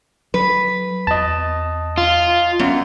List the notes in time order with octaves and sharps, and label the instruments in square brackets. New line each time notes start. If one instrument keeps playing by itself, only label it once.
[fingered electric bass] F#3 [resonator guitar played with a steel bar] B4
[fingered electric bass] E2 [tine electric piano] D#5 A5
[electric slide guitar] F4
[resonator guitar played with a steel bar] F#2 [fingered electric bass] B3